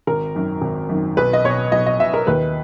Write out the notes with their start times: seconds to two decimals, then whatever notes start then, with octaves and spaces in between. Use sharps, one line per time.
0.07 G#1 A#4
0.35 F#2 D#3
0.62 G#1
0.89 F#2 D#3
1.17 B1 B4
1.33 D#5
1.44 B2 C#5
1.72 B1 D#5
1.86 D#5
1.99 B2 E5
2.14 A#4
2.27 D#2 B4